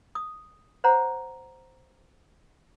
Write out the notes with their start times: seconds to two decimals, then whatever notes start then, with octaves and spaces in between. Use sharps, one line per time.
0.15 D#6
0.84 C5 C#5 F#5 A#5